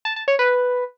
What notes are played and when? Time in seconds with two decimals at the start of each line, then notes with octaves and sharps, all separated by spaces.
0.05 A5
0.16 A5
0.28 C#5
0.39 B4